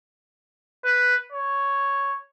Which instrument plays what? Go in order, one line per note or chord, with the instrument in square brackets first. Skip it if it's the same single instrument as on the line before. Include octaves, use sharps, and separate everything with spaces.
[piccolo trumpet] B4
C#5